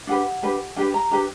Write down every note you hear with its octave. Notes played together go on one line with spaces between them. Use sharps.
D4 G4 B4 F#5
D4 G4 B4
D4 G4 B4 G5
A#5
D4 G4 B4 A#5